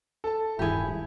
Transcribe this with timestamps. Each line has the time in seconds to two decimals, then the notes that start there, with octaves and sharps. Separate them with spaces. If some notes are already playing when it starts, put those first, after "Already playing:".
0.24 A4 A5
0.59 D1 G2 D#3 E4 G4 G#4